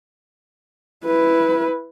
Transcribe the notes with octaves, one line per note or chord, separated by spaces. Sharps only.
E4 B4